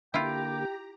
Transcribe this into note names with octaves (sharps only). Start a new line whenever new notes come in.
D3 A#3 E4 F4 G4 G5 A#5 D6